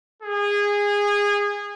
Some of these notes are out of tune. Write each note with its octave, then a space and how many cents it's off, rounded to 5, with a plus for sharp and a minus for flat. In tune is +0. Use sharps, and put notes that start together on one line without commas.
G#4 -20